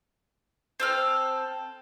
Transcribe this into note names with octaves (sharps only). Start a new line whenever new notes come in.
C4 A4 F6